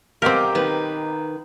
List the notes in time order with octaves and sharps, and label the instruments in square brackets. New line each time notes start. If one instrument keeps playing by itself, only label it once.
[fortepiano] B1 F5 F6 [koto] C4 A#4 [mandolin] G4 D#5 D6
[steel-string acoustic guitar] D#3 B4